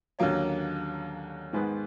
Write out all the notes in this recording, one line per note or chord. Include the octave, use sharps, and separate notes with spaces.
D#2 D3 F#3 A#3 C#4
G#2 D#3 G#3 B3